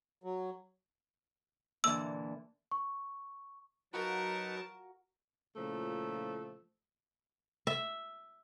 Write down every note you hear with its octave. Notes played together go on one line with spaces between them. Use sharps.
F#3
A#2 D3 E3 E6
C#6
F#3 D#4 F#4 A#4 B4 F#5 A5
A#2 C#3 F3 A3 E4
E5